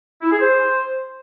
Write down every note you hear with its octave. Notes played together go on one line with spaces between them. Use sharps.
E4
G#4
C5